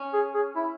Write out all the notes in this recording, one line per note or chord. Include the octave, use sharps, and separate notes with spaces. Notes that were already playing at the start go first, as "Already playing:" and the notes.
Already playing: C#4
G#4
G#4
E4